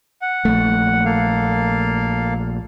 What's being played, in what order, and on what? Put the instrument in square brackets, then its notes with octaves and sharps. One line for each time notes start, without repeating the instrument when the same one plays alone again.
[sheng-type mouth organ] F#5
[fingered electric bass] A#1 A3
[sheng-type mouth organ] A#3 A4 F5